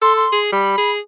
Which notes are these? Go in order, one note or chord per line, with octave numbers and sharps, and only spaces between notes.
A4 C6
C6
G#4
G3 B5
G#4